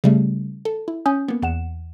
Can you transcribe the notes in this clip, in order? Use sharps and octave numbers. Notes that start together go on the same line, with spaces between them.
C#3 G3 A3
A4
E4
C#4 G#5 D#6 G6
A#3 B3
E2 F#5 E7